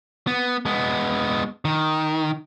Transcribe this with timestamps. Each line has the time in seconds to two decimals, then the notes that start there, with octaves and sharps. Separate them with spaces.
0.27 B3
0.66 G#3 B3
1.65 D#3